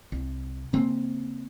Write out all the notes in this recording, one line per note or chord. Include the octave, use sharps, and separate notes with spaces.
C2
C#3 A#3 C4